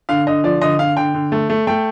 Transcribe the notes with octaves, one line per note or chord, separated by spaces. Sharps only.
D3 F5
D3 D#5
F3 D5
D3 D#5
D3 F5
D3 G5
D3
A3
A3
A3 G5